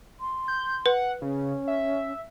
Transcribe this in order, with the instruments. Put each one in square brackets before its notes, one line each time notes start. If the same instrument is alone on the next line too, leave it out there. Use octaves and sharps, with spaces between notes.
[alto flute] C6
[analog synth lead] G6
[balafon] B4 [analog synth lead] F#5
[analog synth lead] C#3 [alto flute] C#4
[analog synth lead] E5